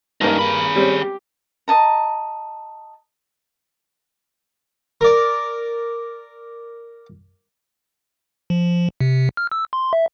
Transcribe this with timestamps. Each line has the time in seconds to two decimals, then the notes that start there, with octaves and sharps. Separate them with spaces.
0.21 G2 A#3 C#4 D#4 A#4
0.39 G#4 B5
0.76 G3 C4 C#4
1.02 G4
1.68 D#5 A5 A#5
5.01 A#4 D5
8.50 F3
9.00 C3
9.37 F6
9.51 E6
9.73 C6
9.93 E5